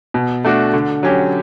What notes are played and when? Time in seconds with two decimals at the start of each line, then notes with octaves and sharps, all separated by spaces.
0.14 B2
0.44 A3 D4 F#4
0.73 D3
1.03 F#3 C#4 G4